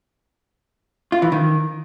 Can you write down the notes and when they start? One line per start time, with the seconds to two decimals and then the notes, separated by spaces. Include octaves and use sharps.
1.12 F4
1.22 E3
1.32 D#3